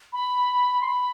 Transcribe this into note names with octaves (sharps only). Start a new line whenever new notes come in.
B5
C6
B5